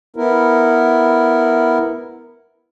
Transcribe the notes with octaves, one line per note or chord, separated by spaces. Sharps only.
B3 E4 A#4